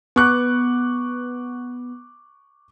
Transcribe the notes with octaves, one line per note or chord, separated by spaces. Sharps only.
B3 C#6 D6 F#6